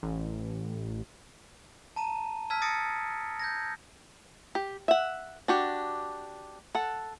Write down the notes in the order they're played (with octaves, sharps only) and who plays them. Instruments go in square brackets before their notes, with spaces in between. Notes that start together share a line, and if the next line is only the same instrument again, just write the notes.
[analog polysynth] A1
[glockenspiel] A5 A#5 D#7
A5 E6 F6 G#6 B6
D#6 A6 A#6 C#7 D7
G6 G#6 A#6
[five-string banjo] G4
E5 F#5
D4 F#4 G4
A4 F#5